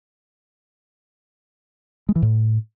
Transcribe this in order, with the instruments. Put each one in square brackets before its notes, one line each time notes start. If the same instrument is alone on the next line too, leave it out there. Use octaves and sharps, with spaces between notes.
[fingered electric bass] G#3
E3
A2